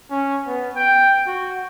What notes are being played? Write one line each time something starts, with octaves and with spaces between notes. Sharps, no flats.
C#4
B3
G5
F#4